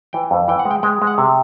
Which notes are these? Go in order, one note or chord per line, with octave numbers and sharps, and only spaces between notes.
E3 G5
F2
E3 G5
F#5
G#3
G5
G#3 G5
G#3
F#5
C3